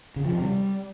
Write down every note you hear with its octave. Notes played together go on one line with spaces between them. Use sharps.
C#3
F3
C3
G3